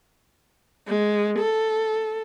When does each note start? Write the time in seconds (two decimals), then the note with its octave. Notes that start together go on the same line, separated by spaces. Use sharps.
0.88 G#3
1.39 A4